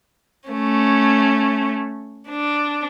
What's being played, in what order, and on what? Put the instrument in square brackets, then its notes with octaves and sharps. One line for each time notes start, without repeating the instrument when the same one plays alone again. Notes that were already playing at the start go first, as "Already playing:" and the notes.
[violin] A3 C#4
D4